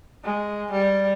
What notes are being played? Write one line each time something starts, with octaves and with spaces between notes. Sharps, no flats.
G#3
G3